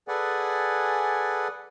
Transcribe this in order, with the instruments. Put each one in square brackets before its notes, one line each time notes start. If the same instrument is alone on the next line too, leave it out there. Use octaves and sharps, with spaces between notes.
[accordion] G#4 A4 B4 D5 F#5 G#5